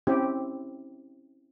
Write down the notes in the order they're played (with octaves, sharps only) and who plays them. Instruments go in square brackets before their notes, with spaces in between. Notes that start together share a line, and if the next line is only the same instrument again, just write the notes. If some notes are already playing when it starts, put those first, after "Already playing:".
[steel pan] C4 C#4 E4 G4